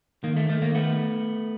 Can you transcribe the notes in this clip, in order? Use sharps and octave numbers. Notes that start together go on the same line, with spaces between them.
D#3 A#3
A3
D#3 A3
A#3
A3 B3